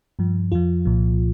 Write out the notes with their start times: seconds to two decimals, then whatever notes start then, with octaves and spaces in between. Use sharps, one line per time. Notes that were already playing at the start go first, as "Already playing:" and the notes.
0.19 G2 F3
0.52 F2 F3 F4
0.85 C2 A#2 F3